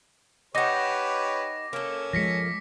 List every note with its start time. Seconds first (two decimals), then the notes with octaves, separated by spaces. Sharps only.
0.55 D#4 G4 B4 C#5 F#5 D6 A#6
1.73 A#3 C#4 A4
2.13 F3 G#3 A#6 B6 C#7